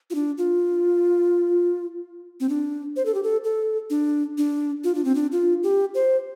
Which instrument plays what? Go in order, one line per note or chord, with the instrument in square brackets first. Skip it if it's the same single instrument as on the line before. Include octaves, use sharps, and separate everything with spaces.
[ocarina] F4
D4
F4
C4
D4
C5
A4
G4
A4
A4
D4
D4
F4
D4
C4
D4
F4
G4
C5